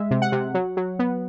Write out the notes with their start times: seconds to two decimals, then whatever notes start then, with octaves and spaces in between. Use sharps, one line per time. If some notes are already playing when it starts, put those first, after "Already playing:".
Already playing: G#3 E5
0.11 C3
0.22 F#5
0.32 C3
0.54 F#3
0.77 F#3
0.99 B3